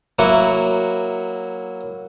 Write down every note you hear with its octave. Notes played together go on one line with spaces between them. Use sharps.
F#3 A#3 E4 F#4